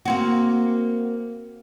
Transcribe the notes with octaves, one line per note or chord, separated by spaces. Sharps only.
A#3 C4 F#4